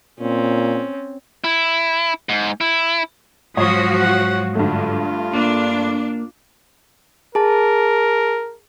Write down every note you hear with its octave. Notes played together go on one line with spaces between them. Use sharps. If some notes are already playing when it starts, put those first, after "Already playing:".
A#2 C4 C#4
E4
G#2
E4
G#2 F3 F#3 F#4 C#5 C#6 D#6
F#5
G2 D3 A3 F4
A#3 D4
G#4 A#4 A5